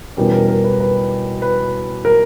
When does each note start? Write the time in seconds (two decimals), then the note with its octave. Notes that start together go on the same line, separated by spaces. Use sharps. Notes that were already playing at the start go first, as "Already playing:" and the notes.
0.17 E2 B2 G3 C#4 A#4
0.33 A#4
0.48 A#4
0.64 B4
0.80 B4
1.42 B4
2.05 A#4